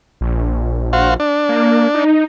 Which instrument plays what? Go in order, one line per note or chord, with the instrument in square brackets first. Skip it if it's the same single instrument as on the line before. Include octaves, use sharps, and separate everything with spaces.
[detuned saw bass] A#1
[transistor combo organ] F#4 C5 F5
D4
[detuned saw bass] A#3
D#4